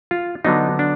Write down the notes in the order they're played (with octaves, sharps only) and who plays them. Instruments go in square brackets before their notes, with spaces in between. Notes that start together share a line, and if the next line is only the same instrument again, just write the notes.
[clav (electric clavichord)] F4
D3 F#3 B3 D4 D#4
D4